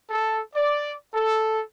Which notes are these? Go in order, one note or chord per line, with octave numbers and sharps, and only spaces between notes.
A4
D5
A4